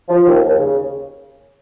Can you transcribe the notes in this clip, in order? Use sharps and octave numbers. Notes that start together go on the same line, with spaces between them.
F3
D#2
D#2
C#3